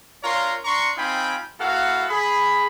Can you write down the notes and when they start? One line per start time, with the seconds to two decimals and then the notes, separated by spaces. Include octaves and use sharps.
0.23 D4 F4 A#4 C#5 A#5 C6
0.65 D4 A#5 C6 C#6
0.97 C4 D#4 F4 G5 G#5 B5
1.59 A#3 E4 F#4 A4 F5 F#5
2.09 G#4 B5